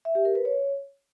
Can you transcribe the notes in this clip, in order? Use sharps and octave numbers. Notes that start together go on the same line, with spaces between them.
E5
G4
A#4
B4
C#5